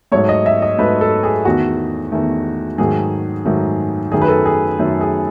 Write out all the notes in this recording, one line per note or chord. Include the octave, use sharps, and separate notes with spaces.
G#2 F#3 A3 C#5
D#5
E5
D#5
G#2 F#3 A3 B4
A4
G#4
E2 D#3 A3 F#4
E2 D#3 A3
G#2 D#3 F#3 A3 G#4
G#2 D#3 F#3 A3
F#2 D#3 A3 G#4
B4
A4
G#4
F#2 D#3 A3
G#4